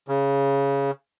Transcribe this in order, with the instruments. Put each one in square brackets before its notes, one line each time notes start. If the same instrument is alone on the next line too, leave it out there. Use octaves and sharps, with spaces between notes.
[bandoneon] C#3